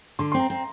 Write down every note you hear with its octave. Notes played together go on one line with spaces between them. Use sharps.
D3 C6
C4 C6
A#5
C4